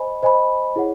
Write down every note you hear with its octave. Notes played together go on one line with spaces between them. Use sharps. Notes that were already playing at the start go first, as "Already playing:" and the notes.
Already playing: C5 D#5 G#5 B5
C5 D#5 G#5 B5
E4 G#4 C#5 F#5